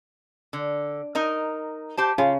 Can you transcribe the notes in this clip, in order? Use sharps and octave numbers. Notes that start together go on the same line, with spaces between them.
D3
D#4 A#4 D#5
G4 C5 A5
C#3 F4